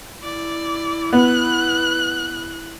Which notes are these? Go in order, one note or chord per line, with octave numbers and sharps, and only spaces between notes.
E4 D5
B3 F#6